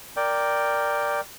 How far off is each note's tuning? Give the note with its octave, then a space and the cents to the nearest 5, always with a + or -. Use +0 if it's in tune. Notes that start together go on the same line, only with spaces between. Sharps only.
A#4 -5 D5 +0 G5 +0